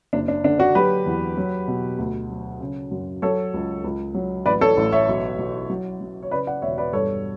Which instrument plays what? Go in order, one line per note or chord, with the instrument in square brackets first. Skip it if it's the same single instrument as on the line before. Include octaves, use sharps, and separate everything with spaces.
[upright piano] F#1 D4
D4
D3 D4
D4 F#4
F#3 G4 B4
E2
F#3
B2
D2
F#3
C#3
F#2
F#3 A4 C#5
C#2
C#2
F#3
A1 B4 D5
A4 C#5
A1
C#5 E5
B1
B1
F#3
F#3
C#5
C#3 B4 D5
D5 F#5
E1 C#5 E5
B4 D5
G2 A4 C#5